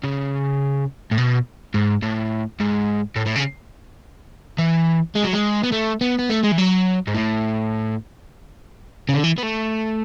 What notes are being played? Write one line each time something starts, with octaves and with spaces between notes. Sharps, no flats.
C#3
A2
B2
G#2
A2
G#2
A2
A2
C#3
E3
G#3
F#3
G#3
B3
A3
B3
B3
A3
G#3
E3
F#3
G#2
A2
C#3
D3
E3
B3
A3